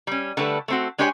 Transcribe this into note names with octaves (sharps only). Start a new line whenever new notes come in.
G3 C#4
D3 G3 A3 A4 B4
A3 C4 F#4
G#3 D4 G4 C#5 D5 G#5